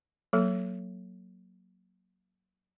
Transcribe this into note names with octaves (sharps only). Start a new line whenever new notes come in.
F#3 A#3 A4